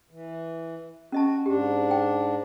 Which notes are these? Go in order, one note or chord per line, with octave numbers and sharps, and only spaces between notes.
E3
C#4 F#4 D#5 A5
G#2 D4 G4
G5